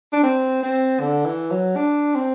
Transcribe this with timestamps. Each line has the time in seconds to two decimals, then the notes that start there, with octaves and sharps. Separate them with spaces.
0.13 D4
0.23 C4
0.63 C4
1.00 D3
1.26 E3
1.51 F#3
1.76 D4
2.15 C4